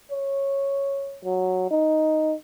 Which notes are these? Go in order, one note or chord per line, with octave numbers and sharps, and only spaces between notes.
C#5
F#3
D#4